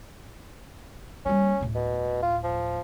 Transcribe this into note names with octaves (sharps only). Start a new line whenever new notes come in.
G3 A#3 C#4
D1 A2
B2
F4
F3